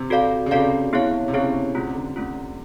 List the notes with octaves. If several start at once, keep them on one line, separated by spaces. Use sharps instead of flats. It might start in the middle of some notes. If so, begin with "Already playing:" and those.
Already playing: C3
F#4 A4 D5 F5
C#3
C3 F#4 A4 D5 F5
B3 E4 G#4 C#5 F5
C3
C#3 B3 E4 G#4 C#5 F5
C3 A3 C#4 F4
D3
A3 C#4 F4